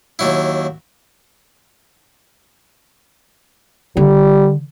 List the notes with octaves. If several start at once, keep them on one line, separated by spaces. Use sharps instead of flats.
D#2 F#3 E4
D3 G3